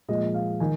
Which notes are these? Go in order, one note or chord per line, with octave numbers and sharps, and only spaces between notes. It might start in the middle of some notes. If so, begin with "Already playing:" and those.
A#2 F3 G#3 D#5
D#5
F5
D#3 G#5